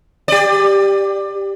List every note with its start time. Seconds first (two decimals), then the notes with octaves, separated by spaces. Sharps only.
0.28 G4 D5